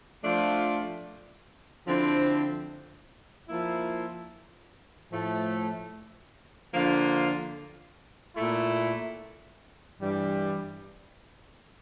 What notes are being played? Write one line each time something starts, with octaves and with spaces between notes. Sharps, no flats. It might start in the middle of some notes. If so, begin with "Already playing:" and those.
F3 A3 D4 F4
D3 F3 C4 E4
F3 A#3 E4
A2 F3 A3
D3 F3 A#3 F4
A#2 A3 E4
G2 E3 G3